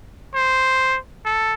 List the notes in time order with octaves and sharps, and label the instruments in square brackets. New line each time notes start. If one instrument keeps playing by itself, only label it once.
[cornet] C5
A4